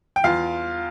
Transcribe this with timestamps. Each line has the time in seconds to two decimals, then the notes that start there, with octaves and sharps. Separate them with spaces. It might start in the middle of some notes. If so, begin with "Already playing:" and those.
0.16 G5
0.24 E2 F4 F5